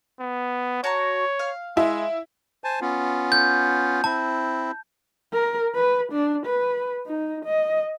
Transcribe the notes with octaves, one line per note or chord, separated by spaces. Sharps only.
B3
F#4 C#5 A5 A#5
F5
G#3 E4
C5 G#5 A5
B3 C#4 F4
G6
C4 E4 A5
A#4
B4
D4
B4
D#4
D#5